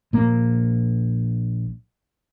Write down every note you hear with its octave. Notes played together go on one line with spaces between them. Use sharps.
A#1 A#3